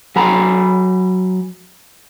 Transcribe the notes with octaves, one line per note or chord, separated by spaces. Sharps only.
F#3 G#5 A#5 B5